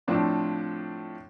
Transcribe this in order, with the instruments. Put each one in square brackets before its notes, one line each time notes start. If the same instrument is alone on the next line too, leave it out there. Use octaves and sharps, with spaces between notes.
[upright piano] A2 F3 C4 D4 F4